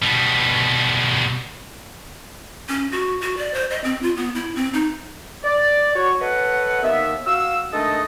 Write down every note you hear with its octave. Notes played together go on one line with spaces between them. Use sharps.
B2 G3
C#4
F#4
F#4
D5
C5
D#5
C4
F4
B3
E4
C4
D#4
D5
F#4 C#5
A4 B4 C#5 D#5 F#5
D#2 B3 E5
F#4 F5 E6
D#3 G#3 A3 D4 A4 D#5